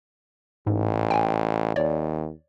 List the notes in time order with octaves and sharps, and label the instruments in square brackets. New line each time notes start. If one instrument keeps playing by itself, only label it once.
[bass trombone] A1 [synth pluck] G#2
[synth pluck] G5 G#5
[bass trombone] D#2 [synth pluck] C#5 D5